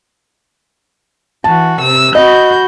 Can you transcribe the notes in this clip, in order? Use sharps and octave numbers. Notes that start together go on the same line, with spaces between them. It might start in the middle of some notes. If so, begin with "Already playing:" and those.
E3 F#4 A5
C3 E6
F#4 D#5 B5 G6